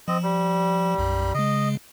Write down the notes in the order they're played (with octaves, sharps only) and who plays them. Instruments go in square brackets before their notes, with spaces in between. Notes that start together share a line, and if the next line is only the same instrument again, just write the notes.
[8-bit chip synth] F3 [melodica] C4 D#5
[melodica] G3
[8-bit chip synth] B1 F#2
[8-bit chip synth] C#3 G#3 [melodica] D#5